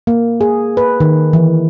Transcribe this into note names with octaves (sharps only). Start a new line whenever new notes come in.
A#3
G#4
B4
D#3
E3